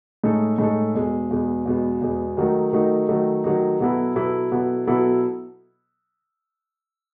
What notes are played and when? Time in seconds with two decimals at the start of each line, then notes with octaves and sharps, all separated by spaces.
0.23 A2 G#3 D#4 A4
0.58 A2 G#3 D#4 A4
0.94 E2 B2 G#3
1.31 E2 B2 G#3
1.65 E2 B2 G#3
2.01 E2 B2 G#3
2.37 D#3 F#3 A3 D#4
2.73 D#3 F#3 A3 D#4
3.09 D#3 F#3 A3 D#4
3.44 D#3 F#3 A3 D#4
3.80 B2 F#3 B3 E4 A4
4.16 B2 F#3 B3 E4 A4
4.52 B2 F#3 B3 E4 A4
4.87 B2 F#3 B3 E4 A4